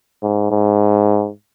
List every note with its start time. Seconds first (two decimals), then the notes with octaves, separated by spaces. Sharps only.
0.23 G#2
0.51 G#2